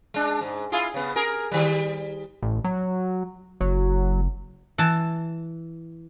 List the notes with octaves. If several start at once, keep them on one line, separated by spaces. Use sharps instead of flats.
G#3 D4
G#2
E4 F4 G#4
C#3 B3
G#4 A#4
D#3 G3
A1
F#3
F#1 F#3
E3 A5